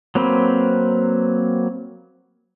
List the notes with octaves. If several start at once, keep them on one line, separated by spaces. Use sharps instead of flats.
F#3 A#3 C4 B4